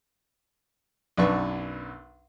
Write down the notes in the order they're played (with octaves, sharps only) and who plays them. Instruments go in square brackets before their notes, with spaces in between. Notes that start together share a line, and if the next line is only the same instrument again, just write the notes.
[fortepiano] B1 F#2 D4 B4 B5 C#6